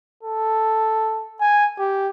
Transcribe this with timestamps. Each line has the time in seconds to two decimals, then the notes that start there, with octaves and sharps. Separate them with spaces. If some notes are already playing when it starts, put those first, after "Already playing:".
0.23 A4
1.41 G#5
1.79 G4